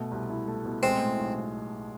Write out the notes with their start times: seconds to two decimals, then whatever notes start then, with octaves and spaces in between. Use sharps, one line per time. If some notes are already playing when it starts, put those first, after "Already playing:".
Already playing: B2 A3
0.11 C2
0.30 E4
0.48 A3
0.65 B2
0.83 G#3 C4
1.01 A2
1.20 B1